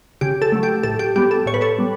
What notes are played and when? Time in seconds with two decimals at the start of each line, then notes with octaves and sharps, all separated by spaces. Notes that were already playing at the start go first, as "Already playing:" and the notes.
0.21 C#3 G4
0.42 A4
0.52 F#3 A3
0.63 G4
0.83 A2 A4
0.99 G4
1.16 G3 B3 G4
1.31 A4
1.46 A2 C#5
1.54 B4
1.61 A4 C#5
1.79 G3 B3